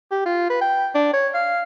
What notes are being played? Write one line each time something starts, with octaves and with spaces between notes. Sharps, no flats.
G4
F4
B4
G5
D4
C#5
F5